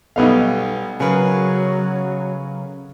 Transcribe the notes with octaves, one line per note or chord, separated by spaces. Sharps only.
B1 G3 A3 B3 D#4 F5
C#3 F#3 G#4 A#4 B4